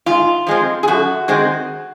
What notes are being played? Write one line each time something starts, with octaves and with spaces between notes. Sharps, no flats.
G#2 F4
F3 G#3 C4
G#4
F#2 F#4
D#3 G#3 C4